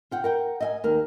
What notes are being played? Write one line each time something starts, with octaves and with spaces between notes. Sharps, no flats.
F4 F#5 G5
A#4 F#5 G5
D#5 E5 G#5
D#2 A#4